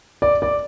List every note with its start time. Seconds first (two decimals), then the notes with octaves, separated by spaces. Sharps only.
0.22 D5
0.42 D5